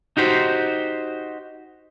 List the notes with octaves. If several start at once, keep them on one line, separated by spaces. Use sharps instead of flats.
D#4 F#4 G4 C5